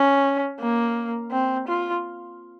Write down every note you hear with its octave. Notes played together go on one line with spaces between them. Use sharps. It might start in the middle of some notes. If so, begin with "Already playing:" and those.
Already playing: C#4
A#3
C4
F4